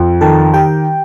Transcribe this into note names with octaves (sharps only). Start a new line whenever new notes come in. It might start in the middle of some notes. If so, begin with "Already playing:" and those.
Already playing: F2
D#3 A4 A5
G4 G5